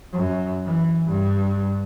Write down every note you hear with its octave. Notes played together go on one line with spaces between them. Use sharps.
F#2
E3
G2